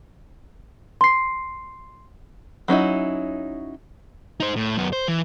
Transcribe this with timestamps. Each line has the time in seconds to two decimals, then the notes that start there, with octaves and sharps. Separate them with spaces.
1.01 C6 C7
2.68 F#3 C#4 D#4 E4
4.40 D#4 C5
4.56 A2
4.77 F#2 B3
4.93 C5
5.08 E3